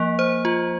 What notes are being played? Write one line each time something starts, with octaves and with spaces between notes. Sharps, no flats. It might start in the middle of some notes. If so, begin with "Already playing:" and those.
Already playing: F3 A#3
C5
F4